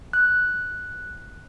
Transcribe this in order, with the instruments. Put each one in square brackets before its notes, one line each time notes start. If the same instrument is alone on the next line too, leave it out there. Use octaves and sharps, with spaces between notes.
[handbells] F#6